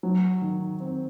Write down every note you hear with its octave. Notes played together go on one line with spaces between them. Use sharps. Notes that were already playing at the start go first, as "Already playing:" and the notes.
F#3
D#3
C4